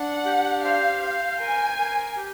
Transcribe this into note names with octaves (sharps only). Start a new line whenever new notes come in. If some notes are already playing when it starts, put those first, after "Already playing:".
Already playing: D4 F#5
G4
C5 F5
C5
A#4 G#5
A#4
G4